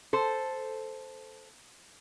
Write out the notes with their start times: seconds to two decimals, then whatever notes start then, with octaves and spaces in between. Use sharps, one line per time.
0.13 A4 C5